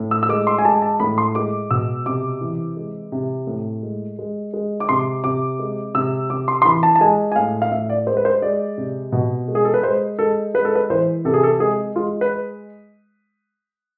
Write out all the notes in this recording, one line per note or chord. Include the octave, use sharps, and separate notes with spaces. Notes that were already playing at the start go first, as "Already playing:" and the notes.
Already playing: A2
E6
E6
G#3 D6
C6
G#5
G#3 A5
A5
A2 B5
C6
G#3 D6
B2 E6
C3 D6
E3
G#3
C3
A2
G#3
G#3
G#3
D6
C3 C6
C3 D6
G#3
C3 E6
C3 D6
C6
C6
E3 B5
A5
A5
G#3 G#5
G#5
A2 F5
F5
A2 E5
D5
G#3 C5
B4
C5
G#3 D5
C3
B2
G#3
G#4
A4
B4
G#3 C5
G#3 A4
G#3 B4
A4
B4
E3 C5
C3 A4
G#4
A4
G#3 G#4
G#3 F4
B4